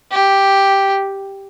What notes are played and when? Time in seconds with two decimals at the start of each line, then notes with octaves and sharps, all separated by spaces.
0.12 G4